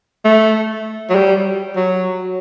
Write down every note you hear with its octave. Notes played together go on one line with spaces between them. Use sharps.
A3
F#3
G3
F#3